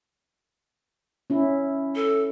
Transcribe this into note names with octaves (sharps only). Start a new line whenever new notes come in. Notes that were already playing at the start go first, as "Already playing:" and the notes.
C#4 E4
A4